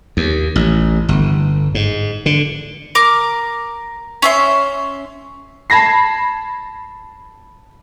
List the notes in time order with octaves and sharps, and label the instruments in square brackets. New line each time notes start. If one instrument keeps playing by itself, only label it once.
[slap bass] D#2
A1
G1
G#2
D3
[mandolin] A#4 D6
C#4 E5 C6
[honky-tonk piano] A5 B5 G#6 A#6 C7